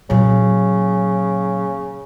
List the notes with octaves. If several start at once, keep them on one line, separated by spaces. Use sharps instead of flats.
A#2 C#3 F#3